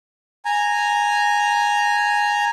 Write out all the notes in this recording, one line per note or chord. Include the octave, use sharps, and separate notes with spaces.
G#5 A#5